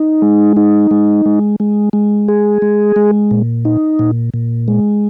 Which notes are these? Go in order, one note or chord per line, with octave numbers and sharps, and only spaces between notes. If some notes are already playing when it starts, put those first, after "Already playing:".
Already playing: D#4
G#3
D#4
G#3
G#3
G#3
G#3
G#4
G#3
G#3
A#2
D#4
A#2
A#2
G#3